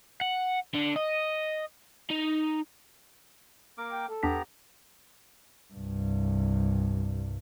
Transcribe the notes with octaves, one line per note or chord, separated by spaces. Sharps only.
F#5
D3
D#5
D#4
A#3 A#4 D6
G5
A4
E2 B3 D4 G4 A#5 B6
C2 G2